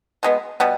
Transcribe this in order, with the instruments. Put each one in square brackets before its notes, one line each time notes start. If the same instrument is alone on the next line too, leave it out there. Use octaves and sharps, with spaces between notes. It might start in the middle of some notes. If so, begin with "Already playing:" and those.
[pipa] B2 G#3 B3
B2 G3 B3